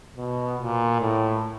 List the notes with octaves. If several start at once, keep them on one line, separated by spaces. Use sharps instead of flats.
B2
A#2
A2